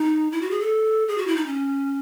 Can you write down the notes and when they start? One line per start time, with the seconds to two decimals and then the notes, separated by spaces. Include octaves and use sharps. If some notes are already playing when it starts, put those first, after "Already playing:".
Already playing: D#4
0.32 E4
0.42 F#4
0.51 G#4
0.61 A4
1.08 G#4
1.18 F#4
1.27 E4
1.36 D#4
1.46 C#4